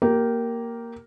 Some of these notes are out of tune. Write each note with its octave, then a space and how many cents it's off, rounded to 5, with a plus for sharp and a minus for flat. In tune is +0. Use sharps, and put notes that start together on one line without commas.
A#3 +0 G4 -15 A#4 +0